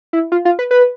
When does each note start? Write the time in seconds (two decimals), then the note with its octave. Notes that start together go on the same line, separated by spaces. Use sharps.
0.13 E4
0.32 F4
0.45 F4
0.59 B4
0.71 B4